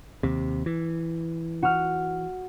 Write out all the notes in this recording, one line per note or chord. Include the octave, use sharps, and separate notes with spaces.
D#2 C3
E3
F#4 F6